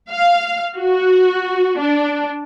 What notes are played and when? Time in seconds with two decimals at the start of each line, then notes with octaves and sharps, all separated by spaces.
0.12 F5
0.77 F#4
1.78 D4